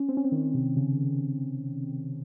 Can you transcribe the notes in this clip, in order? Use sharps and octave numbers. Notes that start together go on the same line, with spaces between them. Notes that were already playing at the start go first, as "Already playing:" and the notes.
Already playing: C#4
C4
C#4
C4
D#3
C3
C#3